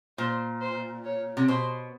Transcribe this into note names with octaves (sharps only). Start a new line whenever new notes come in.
A#2 C5
C5
C#5
C3
B2 C5